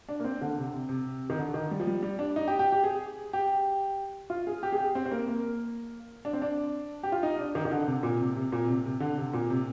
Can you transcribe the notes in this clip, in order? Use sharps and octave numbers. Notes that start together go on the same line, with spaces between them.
D4
A#3
C4
D3
C3
C3
C3
D#3
D3
D#3
G3
F3
G3
G3
D4
D#4
G4
G4
G4
G#4
G4
F4
G#4
G4
G#4
G4
C4
C4
A#3
A#3
D4
C4
D4
G4
F4
D#4
D4
D#3
D#3
D3
C3
A#2
C3
C3
A#2
C3
C3
D3
C3
A#2
C3